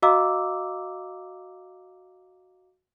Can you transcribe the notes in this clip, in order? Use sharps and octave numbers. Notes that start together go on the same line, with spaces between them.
F#4 D#5 F5 A#5 D6 E6